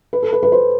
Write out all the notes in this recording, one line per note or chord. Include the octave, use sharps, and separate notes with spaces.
B4
A4
B4
B4
C5